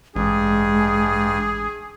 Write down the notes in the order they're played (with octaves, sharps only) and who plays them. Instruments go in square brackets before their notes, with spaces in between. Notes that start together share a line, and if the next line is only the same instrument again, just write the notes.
[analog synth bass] A1 [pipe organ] G2 [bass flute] G#3 [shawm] G#4